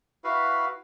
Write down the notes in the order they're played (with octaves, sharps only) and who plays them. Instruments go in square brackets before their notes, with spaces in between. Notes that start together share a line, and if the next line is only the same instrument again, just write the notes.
[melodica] E4 F#4 B4 F5